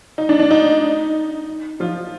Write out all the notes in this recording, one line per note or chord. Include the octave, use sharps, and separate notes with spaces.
D#4
D4
D4
D#4
F3 F4